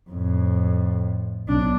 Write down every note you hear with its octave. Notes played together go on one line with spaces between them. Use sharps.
F2 A2
B1 D4